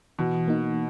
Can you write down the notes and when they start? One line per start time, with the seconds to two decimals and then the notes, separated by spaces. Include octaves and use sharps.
0.19 B2 E3
0.48 A#3 D#4